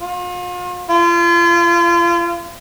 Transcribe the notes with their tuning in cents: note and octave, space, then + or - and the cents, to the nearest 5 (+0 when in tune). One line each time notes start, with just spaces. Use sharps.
F4 +40
F4 -35